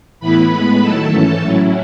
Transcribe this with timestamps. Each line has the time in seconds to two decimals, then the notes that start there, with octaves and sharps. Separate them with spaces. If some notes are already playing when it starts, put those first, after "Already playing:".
0.20 A2 E3 B3 E4 B4 B5
0.50 A2 G#3 B3
0.80 D#3 F#3 A3 E4 A4 A5
1.10 G#2 E3 A3 C#4
1.41 A2 F#3 C#4 E4